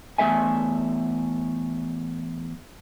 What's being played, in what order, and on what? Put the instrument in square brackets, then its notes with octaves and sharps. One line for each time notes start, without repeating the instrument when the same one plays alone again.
[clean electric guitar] E2 A3 A4 E5 G#5